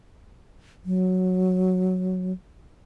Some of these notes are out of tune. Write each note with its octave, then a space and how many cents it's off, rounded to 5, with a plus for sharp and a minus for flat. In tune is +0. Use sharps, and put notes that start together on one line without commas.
F#3 -5